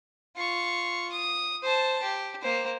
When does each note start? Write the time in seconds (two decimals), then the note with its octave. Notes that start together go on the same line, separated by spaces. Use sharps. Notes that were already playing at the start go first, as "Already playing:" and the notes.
0.36 F4 C#6
1.12 D#6
1.63 C5 A5
2.03 G4
2.42 A#3 C5